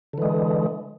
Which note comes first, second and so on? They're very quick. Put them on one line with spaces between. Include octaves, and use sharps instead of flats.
D3 E3 G#3